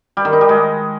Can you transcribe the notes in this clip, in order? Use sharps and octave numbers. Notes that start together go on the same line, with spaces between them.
G3
D#3
D#4
G3
G#3